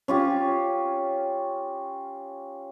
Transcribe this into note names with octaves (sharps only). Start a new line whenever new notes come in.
C#4 F4 G4